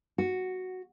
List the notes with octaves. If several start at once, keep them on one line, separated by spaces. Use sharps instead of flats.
F#4